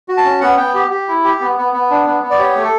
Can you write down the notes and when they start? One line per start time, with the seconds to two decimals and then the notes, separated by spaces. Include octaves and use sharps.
0.08 F#4
0.17 A5
0.25 C#4
0.41 B3 F#5
0.57 B3 G5
0.74 G4
0.90 G4
1.08 E4
1.24 G4
1.40 B3
1.57 B3
1.73 B3
1.90 D4
2.06 B3
2.23 B3
2.30 D5
2.39 G4 C#5
2.56 A3
2.64 A4